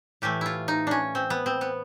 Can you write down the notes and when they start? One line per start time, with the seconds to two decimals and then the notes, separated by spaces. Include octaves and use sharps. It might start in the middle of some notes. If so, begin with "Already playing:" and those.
0.22 A2 E3 A3 G4
0.41 E4 F4
0.68 D#4
0.87 C#4 D4
1.15 C4
1.30 B3
1.46 C4
1.61 B3